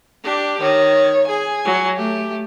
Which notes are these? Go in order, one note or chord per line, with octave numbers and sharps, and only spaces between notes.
D4 G4
D#3 C#5
G#4 G#5
F#3
A3 G4